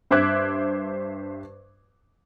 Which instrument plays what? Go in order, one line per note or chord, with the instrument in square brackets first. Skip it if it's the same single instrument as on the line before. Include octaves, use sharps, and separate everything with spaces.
[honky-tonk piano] G2 C5 E5 D6 F#6 G#6